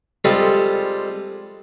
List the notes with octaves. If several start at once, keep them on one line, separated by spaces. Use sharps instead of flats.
G3 G#3 C4 F4 G4 A4